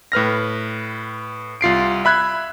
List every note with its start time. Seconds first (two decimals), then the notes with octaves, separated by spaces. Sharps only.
0.12 A2 B4 F6 A#6
1.61 C2 F4 C7 D7
2.05 E5 B5 F#6 G#6